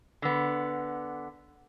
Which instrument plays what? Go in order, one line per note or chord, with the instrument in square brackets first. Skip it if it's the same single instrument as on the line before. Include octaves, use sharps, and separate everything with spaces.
[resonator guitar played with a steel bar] D3 B3